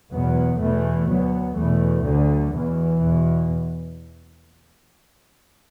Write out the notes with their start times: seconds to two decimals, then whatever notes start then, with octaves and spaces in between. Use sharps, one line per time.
0.11 E2 B2 F#3 B3
0.60 E2 B2 E3 A3
1.08 D2 F#3 B3
1.57 E2 B2 E3 A3
2.05 D2 D3 F#3
2.53 E2 B2 E3
3.02 E2 B2